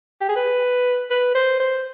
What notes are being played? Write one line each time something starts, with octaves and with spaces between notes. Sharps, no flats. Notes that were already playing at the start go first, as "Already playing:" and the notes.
G4
G#4
B4
B4
C5
C5